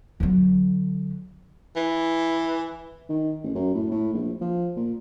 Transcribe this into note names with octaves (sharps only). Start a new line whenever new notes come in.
D3 F#3
E3
D#3
A1
F#2
A2
A2
A#1
F3
A#2